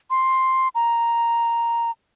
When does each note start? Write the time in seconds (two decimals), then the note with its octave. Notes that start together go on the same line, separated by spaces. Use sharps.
0.10 C6
0.75 A#5